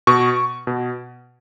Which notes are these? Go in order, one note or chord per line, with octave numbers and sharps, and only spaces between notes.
B2 C#6
B2